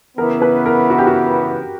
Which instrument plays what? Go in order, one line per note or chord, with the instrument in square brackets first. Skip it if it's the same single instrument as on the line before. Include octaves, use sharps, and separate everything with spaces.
[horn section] C#3 E3 B3 [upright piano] A#4
[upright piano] B4
A#4
F#4
G4
F#4